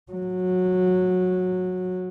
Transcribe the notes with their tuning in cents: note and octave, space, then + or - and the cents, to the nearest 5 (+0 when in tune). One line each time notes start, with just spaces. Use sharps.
F#3 -15